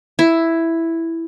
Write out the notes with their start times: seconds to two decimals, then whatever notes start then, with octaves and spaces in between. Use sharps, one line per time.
0.19 E4